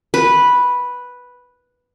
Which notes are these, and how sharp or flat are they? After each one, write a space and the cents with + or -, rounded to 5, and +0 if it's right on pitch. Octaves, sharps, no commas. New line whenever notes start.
B4 -5